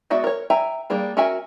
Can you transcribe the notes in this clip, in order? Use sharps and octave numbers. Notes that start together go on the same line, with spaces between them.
G#3 B3 F#4 D5 E5
A#4 C#5
E5 G5 G#5 A#5
G3 A#3 D4 G#4
C#4 F#4 A#4 E5 G#5